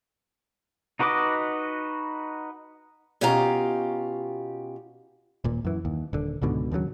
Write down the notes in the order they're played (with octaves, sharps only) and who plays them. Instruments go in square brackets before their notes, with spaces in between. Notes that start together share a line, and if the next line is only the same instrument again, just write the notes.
[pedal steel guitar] D#4 F#4 B4 D#5 D6
[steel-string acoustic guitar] B2 C#4 F4 G4 F5 A#5
[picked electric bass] D#1 A#2
F#2 E3
D#2
D#1 D3
C#2 G#2 B2 D3
D#2 C#3 E3 F#3